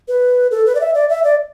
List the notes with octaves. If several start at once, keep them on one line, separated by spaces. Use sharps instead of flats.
B4
A4
B4
D5
E5
D5
E5
D5